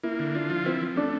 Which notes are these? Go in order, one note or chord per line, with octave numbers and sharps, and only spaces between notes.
A#3 E4
D3
D4 F4
F3
C4 E4
F3
A3 D4